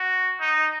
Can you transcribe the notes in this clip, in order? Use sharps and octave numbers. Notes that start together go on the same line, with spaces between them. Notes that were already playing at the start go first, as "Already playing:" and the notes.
Already playing: F#4
D#4